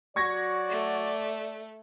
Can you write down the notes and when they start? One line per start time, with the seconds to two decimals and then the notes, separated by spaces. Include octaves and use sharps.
0.16 F#3 F#4 D5 C#6 G#6 A#6
0.70 A3